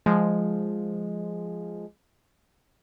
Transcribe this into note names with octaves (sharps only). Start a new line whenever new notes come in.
F3 G#3